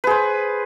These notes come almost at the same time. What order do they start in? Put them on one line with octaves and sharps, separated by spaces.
B4 G#4 C5